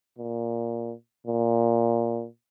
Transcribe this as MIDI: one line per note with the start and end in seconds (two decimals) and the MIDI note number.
0.18 0.94 46
1.27 2.26 46